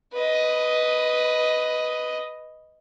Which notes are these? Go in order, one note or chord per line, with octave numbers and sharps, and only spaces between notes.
B4 D#5